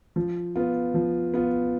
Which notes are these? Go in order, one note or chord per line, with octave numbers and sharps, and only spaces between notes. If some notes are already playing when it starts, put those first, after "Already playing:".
F3
B3 F4
F3
B3 F4